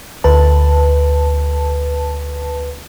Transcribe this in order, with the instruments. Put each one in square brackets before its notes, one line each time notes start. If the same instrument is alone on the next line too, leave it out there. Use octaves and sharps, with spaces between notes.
[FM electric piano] D2 B4 A5